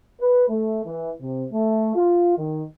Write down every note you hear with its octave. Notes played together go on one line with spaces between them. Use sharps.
B4
A3
E3
C3
A3
F4
D#3